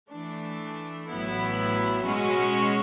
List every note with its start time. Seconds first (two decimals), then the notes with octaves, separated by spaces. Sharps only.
0.10 E3 A3 D4
1.08 A1 A2 F#3 B3 E4
2.05 B2 G#3 C#4 F#4